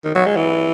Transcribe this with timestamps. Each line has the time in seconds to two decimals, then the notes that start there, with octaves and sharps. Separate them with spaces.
0.04 D#3
0.15 F#3
0.26 G#3
0.36 E3